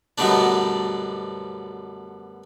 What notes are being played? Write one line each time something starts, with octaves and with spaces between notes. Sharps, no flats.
F#2 B2 D3 G3 A3 D4